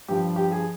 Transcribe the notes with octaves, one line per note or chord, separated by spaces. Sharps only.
G2 F3 G4
G4
G#4